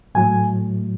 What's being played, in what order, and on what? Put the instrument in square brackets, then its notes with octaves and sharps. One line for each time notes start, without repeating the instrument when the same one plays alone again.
[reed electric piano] A2 F#3 A3 G#5